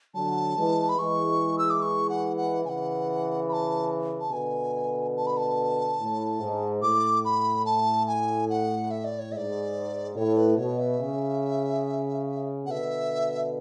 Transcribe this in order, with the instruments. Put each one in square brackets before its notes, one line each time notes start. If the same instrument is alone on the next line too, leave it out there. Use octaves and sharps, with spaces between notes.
[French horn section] D3 F#3 [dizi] A5
[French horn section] E3 G#3
[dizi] B5
[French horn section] E3 G#3 [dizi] C#6
[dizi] E6
D6
C#6
F#5
F#5
[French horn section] C#3 E3 [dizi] F#5 G#5
[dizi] B5
A5
A5
[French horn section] B2 D3 [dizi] G#5
[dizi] A5
B5
A5
[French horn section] A2
G#2
[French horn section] A2 [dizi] D6
[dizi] B5
A5
G#5
F#5
E5
D5
C#5
[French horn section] G#2 [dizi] D5 E5
[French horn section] A2 [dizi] C#5
[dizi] B4
[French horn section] B2 [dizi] C#5
[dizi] E5
[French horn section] C#3
[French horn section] B2 D3 [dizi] E5 F#5